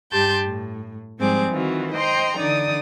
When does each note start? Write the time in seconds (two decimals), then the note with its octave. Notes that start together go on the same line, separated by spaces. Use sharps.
0.12 G2 G4 A5 C6 G6
0.45 A2
1.19 G#2 F3 G3 C4 G#4 D6
1.51 D#3 E3 C4 F4 F#4
1.93 C5 D#5 G5 A#5 C6
2.38 D3 E3 D#4 D5 D#6